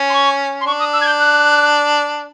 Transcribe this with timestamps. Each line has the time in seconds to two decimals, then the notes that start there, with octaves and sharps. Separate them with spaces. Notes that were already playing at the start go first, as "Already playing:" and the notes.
Already playing: C#4
0.09 C6
0.13 C#6
0.60 C6
0.66 D4 C#6
0.79 D#6
0.92 E6
1.01 G#6
1.06 G6
1.19 F#6